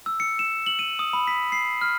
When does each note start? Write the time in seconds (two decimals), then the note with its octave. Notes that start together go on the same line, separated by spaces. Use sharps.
0.06 E6
0.20 C#7
0.39 E7
0.66 F#7
0.79 D#7
0.99 D#6
1.13 B5
1.27 B6
1.52 C7
1.81 F6